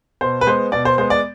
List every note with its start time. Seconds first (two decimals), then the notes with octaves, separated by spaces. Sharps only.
0.21 B2 C5
0.41 B4
0.46 G#3 B3 C5
0.72 B2 D5
0.85 C5
0.98 G#3 B3 C5
1.10 D5